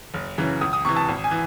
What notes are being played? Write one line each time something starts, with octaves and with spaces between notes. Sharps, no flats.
F#1
F#2 C#3 E3
C#2 D#6
D#6
C3 E3 C#6
A5
G#1
G#5
E3